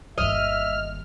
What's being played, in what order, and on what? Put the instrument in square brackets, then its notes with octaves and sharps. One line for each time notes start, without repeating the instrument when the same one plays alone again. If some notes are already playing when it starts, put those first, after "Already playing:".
[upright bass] G1 D#2 [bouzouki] D#5 [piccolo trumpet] E5 [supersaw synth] F6